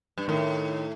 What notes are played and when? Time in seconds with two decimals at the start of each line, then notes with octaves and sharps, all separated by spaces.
0.18 G2
0.28 A2 D#3